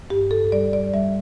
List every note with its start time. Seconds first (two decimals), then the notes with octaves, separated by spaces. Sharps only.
0.10 G2 G4
0.31 A4
0.52 G3 D5
0.73 D5
0.94 G3 E5